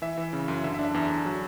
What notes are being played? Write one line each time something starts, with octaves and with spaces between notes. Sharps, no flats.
E3 E5
E3
C#3
F#2
D3 E5
E5
D4
E5
E2
E2
F#3